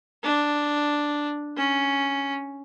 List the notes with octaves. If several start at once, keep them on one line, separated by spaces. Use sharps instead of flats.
D4
C#4